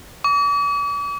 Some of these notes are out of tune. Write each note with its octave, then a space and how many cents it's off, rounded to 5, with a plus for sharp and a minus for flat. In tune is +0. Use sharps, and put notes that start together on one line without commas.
D6 -45